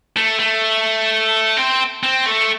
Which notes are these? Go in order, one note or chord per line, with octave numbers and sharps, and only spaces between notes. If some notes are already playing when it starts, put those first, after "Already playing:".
A3
A3
C4
C4
A3